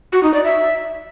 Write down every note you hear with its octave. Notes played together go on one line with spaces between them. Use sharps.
F#4
D#4
D5
E5